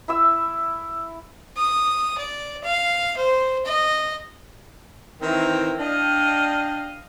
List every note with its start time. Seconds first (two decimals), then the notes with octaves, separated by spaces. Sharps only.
0.08 E4 E5 E6
1.57 D#6
2.18 D5
2.64 F5
3.17 C5
3.65 D#5
5.22 D#3 E3 C4 E4 A#5
5.79 D4 D#5 F5 G5